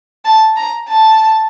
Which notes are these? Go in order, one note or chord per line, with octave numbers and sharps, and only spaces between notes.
A5
A#5
A5